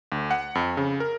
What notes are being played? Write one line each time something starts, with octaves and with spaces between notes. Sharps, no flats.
D2
F#5
F2
C#3
A#4